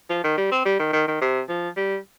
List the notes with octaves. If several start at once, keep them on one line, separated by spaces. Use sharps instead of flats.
F3
D#3
G3
C4
G3
D#3
D#3
D#3
C3
F3
G3